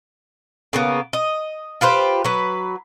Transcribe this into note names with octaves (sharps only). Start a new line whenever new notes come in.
C#3 A#3 B3
D#5
F4 G4 B4 C5
F#3 B4